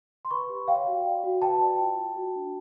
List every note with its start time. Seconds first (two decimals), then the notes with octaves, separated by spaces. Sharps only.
0.25 C6
0.31 B4 B5 C#6
0.49 G4
0.68 C#5 F5 G5
0.87 F#4
1.05 D5
1.24 F#4
1.42 B4 G5 A5
1.60 D5
1.79 F4
1.98 F4
2.16 F#4
2.36 D4